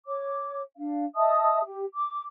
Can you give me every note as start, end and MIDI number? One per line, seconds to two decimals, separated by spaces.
0.06 0.61 73
0.06 0.61 86
0.76 1.04 62
0.76 1.04 77
1.15 1.60 75
1.15 1.60 76
1.15 1.60 81
1.15 1.60 87
1.64 1.84 67
1.93 2.24 86